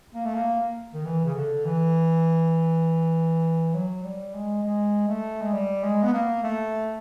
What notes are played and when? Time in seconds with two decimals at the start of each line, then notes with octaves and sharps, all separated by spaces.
0.15 A#3
0.25 A3
0.35 A#3
0.94 D#3
1.05 E3
1.25 C#3
1.35 D3
1.65 E3
3.74 F#3
4.04 G3
4.34 G#3
4.63 G#3
5.08 A3
5.42 G#3
5.53 G3
5.84 G#3
6.03 B3
6.13 A#3
6.43 A3